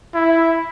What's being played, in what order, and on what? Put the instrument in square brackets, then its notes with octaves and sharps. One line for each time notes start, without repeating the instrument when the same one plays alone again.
[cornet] E4